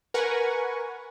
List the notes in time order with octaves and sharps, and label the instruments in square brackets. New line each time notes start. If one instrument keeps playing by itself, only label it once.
[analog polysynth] A#4 B4 F#5 G#5 C#6